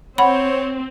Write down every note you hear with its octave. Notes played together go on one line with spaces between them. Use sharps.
C4 C#5 F#5 B5